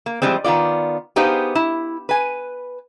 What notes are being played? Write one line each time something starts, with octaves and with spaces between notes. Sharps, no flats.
A#3
E3 F3 G3 G#3 C4
D#3 B3 F4 D5
B3 D#4 G4 G#4 C5 F5
E4
B4 G#5